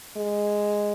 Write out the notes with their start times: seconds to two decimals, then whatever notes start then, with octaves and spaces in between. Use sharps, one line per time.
0.16 G#3